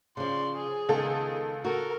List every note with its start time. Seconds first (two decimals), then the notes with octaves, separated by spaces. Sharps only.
0.17 C#3 F3 D5 C6
0.55 G#4
0.89 C#2 D#3 B3 A4
1.65 F#4 A4 A#4